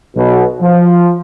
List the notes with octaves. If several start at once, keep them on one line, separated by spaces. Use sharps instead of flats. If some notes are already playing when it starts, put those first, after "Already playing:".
B1 B2
F3